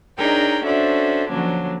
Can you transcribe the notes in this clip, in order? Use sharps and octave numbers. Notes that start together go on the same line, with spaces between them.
D4 D#4 G#4 A#4 C#5 G5
C#4 D4 F#4 A4 C5 E5
D3 F3 F#3 A#3 C#4 D4